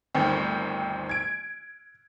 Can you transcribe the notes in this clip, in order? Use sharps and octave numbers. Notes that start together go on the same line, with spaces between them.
G1 D2 D#3 C4
G#6 D7